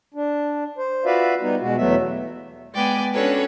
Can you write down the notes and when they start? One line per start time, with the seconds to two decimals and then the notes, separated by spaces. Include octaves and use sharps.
0.14 D4
0.78 C5
1.05 F4 F#4 B4 D5 E5 F5
1.41 G3 B3 D#4
1.60 B2 G#3 F#4
1.77 E2 F#3 A3 B3 E5
2.72 G#3 B3 D5 G5 G#5
3.13 C#4 D4 F#4 A4 B4 C#5